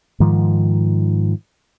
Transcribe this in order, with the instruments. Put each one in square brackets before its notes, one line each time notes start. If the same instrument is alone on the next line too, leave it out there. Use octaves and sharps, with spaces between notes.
[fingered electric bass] G#2 D#3 F3